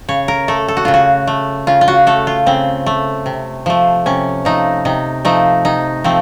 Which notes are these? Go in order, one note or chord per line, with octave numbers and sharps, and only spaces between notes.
C#3 C#5
A#4
A3 A4
A4
F#4
C#3 F4
F#4
A3
C#3 F4
F4
F#4
A3 A4
F4
C#3 C4
A3
C3
F3 A3
C3 C#4
F3 A3 D#4
C3 D#4
F3 A3 D#4
C3 D#4
F3 A3 C4